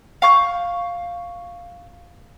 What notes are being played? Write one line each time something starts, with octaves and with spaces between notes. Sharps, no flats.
F5 C#6 G6